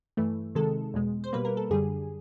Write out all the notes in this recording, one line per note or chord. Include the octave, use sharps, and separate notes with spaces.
G2 E3 A3
C3 D#3 G#3 A4
E2 B2 G#3
C5
B2 G3 A#3 B4
A#3 A#4
A4
F#2 D3 G3 G#4